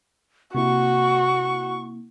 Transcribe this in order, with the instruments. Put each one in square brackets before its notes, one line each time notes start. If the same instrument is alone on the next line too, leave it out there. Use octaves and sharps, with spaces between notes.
[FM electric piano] C3 A#3 E4 [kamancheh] F#4 [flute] C#6